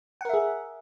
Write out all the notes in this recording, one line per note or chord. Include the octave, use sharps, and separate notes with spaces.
G#4 A#4 E5 F#5